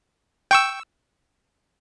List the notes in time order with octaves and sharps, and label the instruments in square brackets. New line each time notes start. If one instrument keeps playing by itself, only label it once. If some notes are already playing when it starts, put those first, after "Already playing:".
[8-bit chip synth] G5 C#6 E6